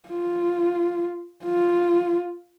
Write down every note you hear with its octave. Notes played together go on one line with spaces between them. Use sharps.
F4
F4